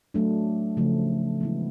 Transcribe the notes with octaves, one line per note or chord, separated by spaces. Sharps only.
F#3 A3 D4
C#3 F3 A3
E3 G#3 B3 E4